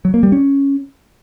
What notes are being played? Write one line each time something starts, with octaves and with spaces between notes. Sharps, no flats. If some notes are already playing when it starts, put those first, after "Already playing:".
F#3
A#3
G3
C#4